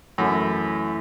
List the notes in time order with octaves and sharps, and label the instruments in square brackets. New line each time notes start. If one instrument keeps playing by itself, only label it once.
[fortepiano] F#2 [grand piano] E3 A3 E4